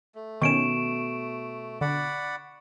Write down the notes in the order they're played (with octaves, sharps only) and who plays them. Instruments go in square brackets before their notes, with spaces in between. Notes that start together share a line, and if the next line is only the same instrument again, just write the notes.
[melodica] A3
[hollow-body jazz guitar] B2 [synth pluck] D#3 C#4 [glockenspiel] C#6 D7 E7
[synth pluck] D3 [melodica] D5 F#5 B5